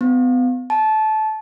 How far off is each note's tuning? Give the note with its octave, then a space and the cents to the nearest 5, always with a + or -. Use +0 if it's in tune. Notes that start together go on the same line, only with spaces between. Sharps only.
B3 +35
A5 -20